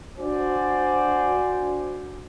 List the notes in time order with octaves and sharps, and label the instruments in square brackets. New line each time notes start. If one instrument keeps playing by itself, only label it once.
[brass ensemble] D4 F#4 C5 D5 G#5